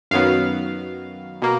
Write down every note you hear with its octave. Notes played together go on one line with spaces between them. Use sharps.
F#2 D#3 F#3 B3 F5
B2 A#3